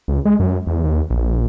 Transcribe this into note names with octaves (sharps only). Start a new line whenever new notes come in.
C#2
G#3
F#2
E2
D#2
A#1